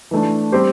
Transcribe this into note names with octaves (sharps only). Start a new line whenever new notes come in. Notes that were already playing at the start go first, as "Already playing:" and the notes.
E3 A3 D4
G3 C4 G4 C5